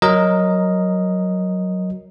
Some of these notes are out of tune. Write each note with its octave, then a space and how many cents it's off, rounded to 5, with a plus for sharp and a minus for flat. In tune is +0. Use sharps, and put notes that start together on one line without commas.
F#3 +0 A#4 +0 D#5 +0